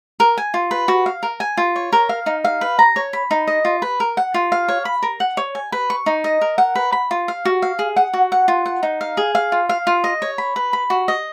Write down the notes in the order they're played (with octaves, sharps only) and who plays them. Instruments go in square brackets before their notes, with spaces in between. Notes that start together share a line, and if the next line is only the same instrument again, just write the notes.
[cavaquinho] A#4
G#5
F4
B4
F#4
F5
A#4
G#5
F4
C#5
A#4
F5
D#4
F5
B4
A#5
C#5
B5
D#4
D#5
F4
B4
A#4
F#5
F4
F5
C#5
B5
A#4
F#5
C#5
G#5
B4
C#6
D#4
D#5
A#4
F#5
B4
B5
F4
F5
F#4
F5
G#4
F#5
F#4
F#5
F4
F#5
D#4
F5
G#4
F5
F4
F5
F4
D#5
C#5
B5
B4
B5
F#4
D#5